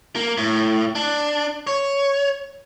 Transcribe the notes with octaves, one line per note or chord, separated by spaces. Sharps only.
A#3
A2
D4
C#5